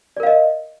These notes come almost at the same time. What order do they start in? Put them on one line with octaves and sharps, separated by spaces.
D5 A#4 F5 D#5